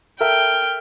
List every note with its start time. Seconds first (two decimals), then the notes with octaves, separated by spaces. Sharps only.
0.21 A4 A#4 E5 G5 F6